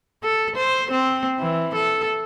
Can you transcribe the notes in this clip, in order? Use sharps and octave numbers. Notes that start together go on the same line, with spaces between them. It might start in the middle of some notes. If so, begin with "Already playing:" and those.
A4
C5
C4
E3
A4